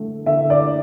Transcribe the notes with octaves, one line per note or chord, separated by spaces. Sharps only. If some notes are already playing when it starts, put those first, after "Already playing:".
Already playing: D3 A3
D3 E5
D5